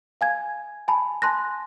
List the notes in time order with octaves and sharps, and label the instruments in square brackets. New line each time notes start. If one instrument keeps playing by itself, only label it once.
[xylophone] F5 G#5 G#6
G#5 A5 B5
G#5 A5 C6 F#6 A#6